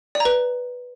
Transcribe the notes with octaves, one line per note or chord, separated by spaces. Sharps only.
D5
A#5
B4